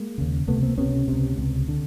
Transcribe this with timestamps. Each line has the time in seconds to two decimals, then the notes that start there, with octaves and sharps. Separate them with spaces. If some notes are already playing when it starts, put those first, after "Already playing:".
Already playing: G#3 A#3
0.18 D#2 C#3
0.47 C#2 C3 A3 B3
0.63 A#3 C4
0.78 C#2 C3 B3 C#4
1.08 C#2 C3
1.38 C#2 C3
1.68 D3